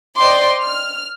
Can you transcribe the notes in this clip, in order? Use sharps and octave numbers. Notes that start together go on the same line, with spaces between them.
C5 D5 D#5 G5 C6 D6
F6